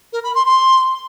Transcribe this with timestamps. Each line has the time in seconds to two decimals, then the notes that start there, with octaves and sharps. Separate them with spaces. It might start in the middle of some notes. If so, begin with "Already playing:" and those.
0.13 A#4
0.24 B5
0.35 C6
0.45 C6